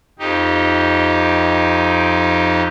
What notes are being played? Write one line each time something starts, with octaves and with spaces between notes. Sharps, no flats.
F2 D#4 G4